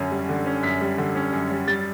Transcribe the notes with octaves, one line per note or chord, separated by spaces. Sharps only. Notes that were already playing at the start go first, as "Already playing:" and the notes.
Already playing: F#2 D3 C#4
G3
D3
C#4
F#2 B6
G3
D3
C#4
F#2
G3
G3 A6